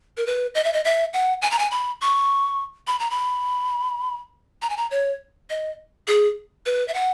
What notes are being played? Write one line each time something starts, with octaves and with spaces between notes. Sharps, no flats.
A#4
B4
D#5
E5
D#5
E5
F#5
G#5
A#5
G#5
B5
C#6
B5
A#5
B5
A#5
G#5
A#5
C#5
D#5
G#4
B4
E5
F#5